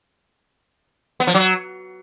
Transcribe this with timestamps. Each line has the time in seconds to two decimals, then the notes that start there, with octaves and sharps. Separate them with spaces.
1.20 B3
1.27 F3
1.35 F#3